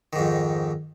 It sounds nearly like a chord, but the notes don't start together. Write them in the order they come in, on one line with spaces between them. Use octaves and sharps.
D#3 G#2 F2